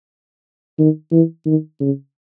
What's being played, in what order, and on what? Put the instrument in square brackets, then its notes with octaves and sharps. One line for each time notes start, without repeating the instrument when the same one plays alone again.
[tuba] D#3
E3
D#3
C#3